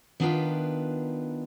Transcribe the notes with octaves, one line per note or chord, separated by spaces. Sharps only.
D#3 B3 D4 F4 B4 G5